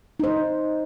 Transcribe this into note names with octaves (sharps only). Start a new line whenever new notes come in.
D#4 C5